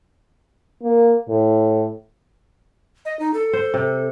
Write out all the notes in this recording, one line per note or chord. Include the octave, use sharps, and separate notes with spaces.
A#3
A2
D#5
D#4
A4
C5
C3